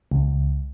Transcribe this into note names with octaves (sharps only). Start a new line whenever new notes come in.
C#2